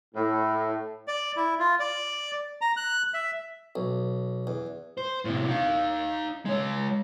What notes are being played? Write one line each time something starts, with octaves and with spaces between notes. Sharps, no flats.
A2
D5
E4
F4
D5
A#5
F#6
E5
B1
E2
C5
A2 C3
D#4 F5
G#3 C#5